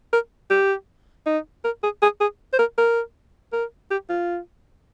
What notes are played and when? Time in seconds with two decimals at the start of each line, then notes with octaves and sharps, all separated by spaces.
0.13 A#4
0.50 G4
1.26 D#4
1.65 A#4
1.83 G#4
2.02 G#4
2.21 G#4
2.53 C5
2.59 A#4
2.78 A#4
3.53 A#4
3.91 G4
4.09 F4